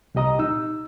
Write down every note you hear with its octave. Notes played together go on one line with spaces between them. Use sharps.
C2 A#2 G4 D#5 A#5 D#6
D#4 E6